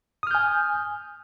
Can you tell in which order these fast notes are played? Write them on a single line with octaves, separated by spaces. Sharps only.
D#6 F6 G6 G#5